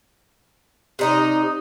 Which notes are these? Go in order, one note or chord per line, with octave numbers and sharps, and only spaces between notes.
C3 D#4 D#5